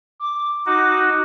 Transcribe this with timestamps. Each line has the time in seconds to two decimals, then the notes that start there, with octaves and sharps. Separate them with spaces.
0.20 D6
0.66 D#4 F#4 D6